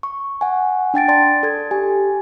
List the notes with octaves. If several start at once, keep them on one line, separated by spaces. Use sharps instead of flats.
C#6
F#5 G#5
D4 G5 A6 D7
D5 A5 C6 A6
A4 G#6
G4 G#5